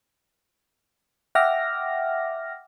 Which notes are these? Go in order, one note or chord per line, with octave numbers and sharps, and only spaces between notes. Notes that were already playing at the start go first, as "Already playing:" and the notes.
E5 F#5 G5 D6 F6 A#6